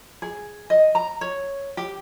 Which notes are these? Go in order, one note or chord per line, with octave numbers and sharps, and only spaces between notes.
G#4
D#5
A#5
C#5
G4